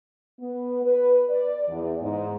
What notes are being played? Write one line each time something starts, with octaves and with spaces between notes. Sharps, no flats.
B3
B4
D5
E2
G#2